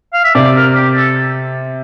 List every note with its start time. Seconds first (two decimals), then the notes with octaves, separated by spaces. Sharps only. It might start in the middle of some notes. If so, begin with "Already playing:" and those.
0.13 F5
0.24 E5
0.35 C3 D5
0.56 A#4
0.75 G4
0.95 A4